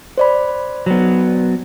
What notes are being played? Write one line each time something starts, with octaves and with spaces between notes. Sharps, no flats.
C5 D5 B5
F#3 B3